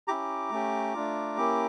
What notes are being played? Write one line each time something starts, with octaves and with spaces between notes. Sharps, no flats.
C#4 E4 G4 A#5 D6
A3 C#4 G4
A3 D4 F4
A#3 C#4 E4 G4